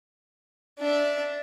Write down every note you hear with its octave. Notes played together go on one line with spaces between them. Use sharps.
D4 E5